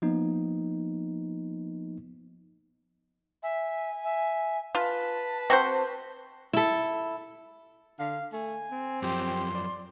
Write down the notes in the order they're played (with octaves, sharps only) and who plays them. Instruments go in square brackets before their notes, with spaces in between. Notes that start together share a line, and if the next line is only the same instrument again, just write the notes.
[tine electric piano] F3 A#3 B3 D#4
[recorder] E5 [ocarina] G#5
[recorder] E5
[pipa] F4 [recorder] B4 [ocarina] A5
[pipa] C4 F#4 C5
[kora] E4 A4
[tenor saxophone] D3 [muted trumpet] F5
[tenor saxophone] A3 [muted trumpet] G#5
[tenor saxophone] C4
[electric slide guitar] F#2 F3 [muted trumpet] G4 [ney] C6
[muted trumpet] D5